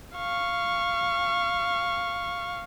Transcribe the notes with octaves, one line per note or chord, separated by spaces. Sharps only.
F5 C#6